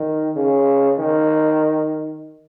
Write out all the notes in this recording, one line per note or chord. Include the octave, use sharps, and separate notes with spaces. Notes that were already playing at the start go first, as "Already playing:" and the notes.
Already playing: D#3
C#3
D#3